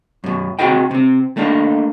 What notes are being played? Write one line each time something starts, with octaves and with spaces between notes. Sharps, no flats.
F#2 B2
C3 D#4 F#4 G#4 D#5 G5
C3 C4
A3 A#3 D4 D#4